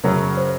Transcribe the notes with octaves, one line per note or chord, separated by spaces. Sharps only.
F#2 C#3 F#3 C#4 A#4
C5